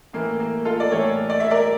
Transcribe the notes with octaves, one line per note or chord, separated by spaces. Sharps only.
A2 E3 A3 A#3
A#3
F4 A4
D5
A2 E3 A3 A4 C#5
D5
E5
A#4 D5